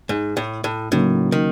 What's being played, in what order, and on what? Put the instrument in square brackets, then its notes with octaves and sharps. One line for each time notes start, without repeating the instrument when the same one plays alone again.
[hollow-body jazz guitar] G#2
A2
A2
[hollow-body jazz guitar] A2 [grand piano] C#3 F#3 A#3 D#4
[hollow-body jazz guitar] D#3